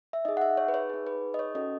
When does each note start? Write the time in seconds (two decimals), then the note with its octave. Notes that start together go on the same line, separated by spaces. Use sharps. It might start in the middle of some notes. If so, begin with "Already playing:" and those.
0.13 E5
0.25 D#4 G#4 D#5
0.37 F#5
0.42 E5
0.57 C#5
0.68 B4
0.74 C#5
0.90 D#4 G#4
1.07 B4
1.34 D#5
1.39 C#5
1.55 C#4 F#4 A4 D#5